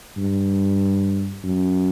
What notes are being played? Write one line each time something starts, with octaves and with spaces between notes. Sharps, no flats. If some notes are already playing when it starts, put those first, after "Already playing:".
G2
F#2